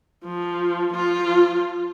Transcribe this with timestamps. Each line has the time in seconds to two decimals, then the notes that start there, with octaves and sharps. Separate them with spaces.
0.24 F3
0.94 F3 F4